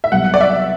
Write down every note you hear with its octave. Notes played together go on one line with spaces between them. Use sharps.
E5
C2 B2 F#3 B3 F#5
D5
E5